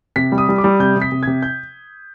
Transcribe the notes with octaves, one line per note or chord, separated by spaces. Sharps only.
C3 B6
G3
D#6
G3
D6
G3
C3 G6
C3
B6
C3
C3 G#6
G6